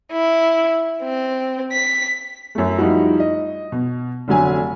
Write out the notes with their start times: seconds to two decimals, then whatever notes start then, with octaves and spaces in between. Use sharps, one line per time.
0.12 E4
1.03 C4
1.72 B6
2.55 F#2 A3
2.78 F3 G3 D#4 E4 F#4
3.20 D#5
3.72 B2
4.28 F1 D3 F#3 G#5